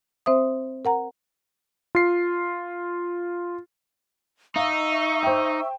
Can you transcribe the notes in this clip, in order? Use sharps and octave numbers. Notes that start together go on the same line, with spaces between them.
C4 C5 E5 D#6
A#4 F#5 A#5
F4 C7
D#4 E5 F5 C#6 E6
C5 G5